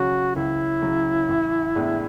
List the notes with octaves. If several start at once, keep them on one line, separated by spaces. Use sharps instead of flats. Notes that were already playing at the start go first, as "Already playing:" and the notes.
Already playing: C#2 C#3 F#3 C#4 F#4
C#2 E4
C#3 F#3 C#4
A1
A2 G#3 B3 D4